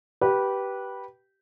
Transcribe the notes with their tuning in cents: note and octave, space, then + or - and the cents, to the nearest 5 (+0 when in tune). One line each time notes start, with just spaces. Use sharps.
G4 -15 B4 -15